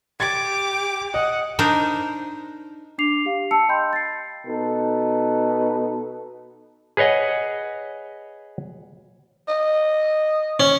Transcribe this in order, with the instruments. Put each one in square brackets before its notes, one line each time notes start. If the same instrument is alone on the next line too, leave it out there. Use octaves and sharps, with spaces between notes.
[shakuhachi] G4 [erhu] D6 [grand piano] G#6 A6
[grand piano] D#5 D#6 [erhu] F#5
[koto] D4 D#4 A#4 C5
[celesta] D4 D6 C7 F7
G4 F5
A5 E6 C#7
D#5 G5 B5 C6 G6
A6 C7
[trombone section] B2 D#4 A4 B4
[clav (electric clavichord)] G#4 B4 C#5 D#5 F#5
[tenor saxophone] D#5
[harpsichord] C#4